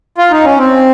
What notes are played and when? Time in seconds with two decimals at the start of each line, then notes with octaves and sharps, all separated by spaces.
0.18 F4
0.31 D#4
0.44 C#4
0.58 C4